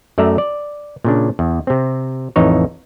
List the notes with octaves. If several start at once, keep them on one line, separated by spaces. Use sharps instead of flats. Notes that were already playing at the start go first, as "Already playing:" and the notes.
F#2 A3 D5 E5 A#5
D5
A#2 C#3 D4
E2
C3 C4
A1 F2 E3 D#4 C#5